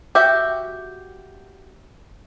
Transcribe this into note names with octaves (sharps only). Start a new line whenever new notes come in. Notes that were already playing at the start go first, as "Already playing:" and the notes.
F#4 G4 E5 G5